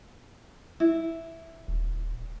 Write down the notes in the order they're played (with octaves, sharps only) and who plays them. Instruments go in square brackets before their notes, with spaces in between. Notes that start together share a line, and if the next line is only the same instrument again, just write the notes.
[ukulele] E4
[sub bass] D#1